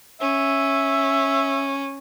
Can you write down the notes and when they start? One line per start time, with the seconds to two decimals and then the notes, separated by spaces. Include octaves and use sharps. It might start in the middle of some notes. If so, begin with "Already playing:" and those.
0.21 C#4 E5